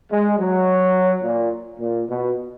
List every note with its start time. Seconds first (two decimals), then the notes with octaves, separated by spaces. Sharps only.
0.10 G#3
0.38 F#3
1.23 A#2
1.79 A#2
2.08 B2